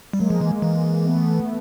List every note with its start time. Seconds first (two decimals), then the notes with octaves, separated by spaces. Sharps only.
0.13 G3
0.20 F#3 G#3 A#3
0.30 F3
0.41 E3
0.62 E3
1.06 A3 B3